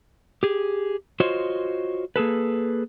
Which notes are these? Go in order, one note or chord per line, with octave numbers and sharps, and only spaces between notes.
G4 G#4
F4 F#4 C5 C#5 D#5
A#3 G#4 A4 B4